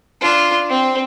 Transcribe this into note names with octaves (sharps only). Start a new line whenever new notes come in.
D4 F4
C4